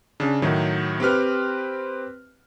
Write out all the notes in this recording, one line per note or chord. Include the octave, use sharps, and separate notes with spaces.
C#3 D4
A2 D#3 F#3
C4 G4 B4 F6